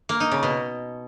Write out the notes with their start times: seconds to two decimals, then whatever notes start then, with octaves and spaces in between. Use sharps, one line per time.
0.09 A#3
0.20 D#4
0.31 C#3
0.43 B2